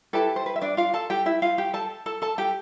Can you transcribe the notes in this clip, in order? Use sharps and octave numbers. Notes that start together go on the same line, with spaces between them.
E4 G4 A4 B4 A5
C5
B4
E5
D4 D5
F4 F5
A4 A5
G4 G5
E4 E5
F4 F5
G4 G5
A4 A5
A4 A5
A4 A5
G4 G5